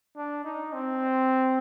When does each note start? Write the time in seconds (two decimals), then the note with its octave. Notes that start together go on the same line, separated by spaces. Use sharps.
0.17 D4
0.45 D#4
0.73 C4